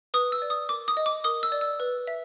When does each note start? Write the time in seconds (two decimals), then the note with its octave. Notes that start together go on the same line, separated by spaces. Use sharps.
0.14 B4 D#6
0.32 E6
0.42 D5
0.50 D#6
0.69 A#4 D6
0.88 D#6
0.97 D#5
1.06 D6
1.24 A#4 D#6
1.43 E6
1.52 D5
1.61 E6
1.80 B4
2.07 E5